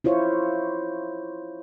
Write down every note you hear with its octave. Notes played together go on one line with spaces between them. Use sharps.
E4 F4 C5 C#5